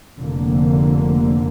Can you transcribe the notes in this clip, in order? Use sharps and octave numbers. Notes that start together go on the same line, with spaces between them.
F1 F2 D3 A#3